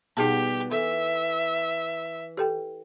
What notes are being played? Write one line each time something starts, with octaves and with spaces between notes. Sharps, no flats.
B2 G3 D#4 G4 G#4 A5
E3 A4 E5
G4 A4 G5